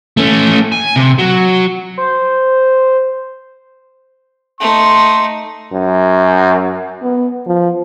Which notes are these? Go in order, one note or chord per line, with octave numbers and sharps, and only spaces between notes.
A3 C#4
G#5
C3
F#3
C5
A3 D#4 C6
F#2
B3
F3